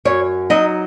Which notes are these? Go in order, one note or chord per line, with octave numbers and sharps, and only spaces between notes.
F#2 C#5
F#3 D#4 D#5